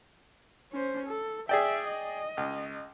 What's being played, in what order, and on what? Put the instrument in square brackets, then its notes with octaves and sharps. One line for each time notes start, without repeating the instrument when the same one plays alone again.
[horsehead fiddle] C#4 C5
A4
[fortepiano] G#4 D5 G5 [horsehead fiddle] E5
[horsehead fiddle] D#5
[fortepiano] C#2